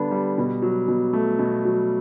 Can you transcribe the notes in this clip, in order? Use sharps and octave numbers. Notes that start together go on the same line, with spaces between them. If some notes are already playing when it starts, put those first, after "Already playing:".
Already playing: D3 G3 B3 D4
G3
B2
F#3
B2
A3
B2
F#3